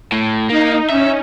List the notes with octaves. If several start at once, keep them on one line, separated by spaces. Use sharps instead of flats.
A2
A#3 D#4
C#4 E5